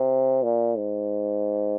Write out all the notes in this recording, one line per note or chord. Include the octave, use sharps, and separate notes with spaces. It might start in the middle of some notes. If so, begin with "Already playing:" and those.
Already playing: C3
A#2
G#2